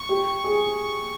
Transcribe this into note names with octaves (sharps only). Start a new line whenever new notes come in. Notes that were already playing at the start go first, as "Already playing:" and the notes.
Already playing: C#6
G4
G#4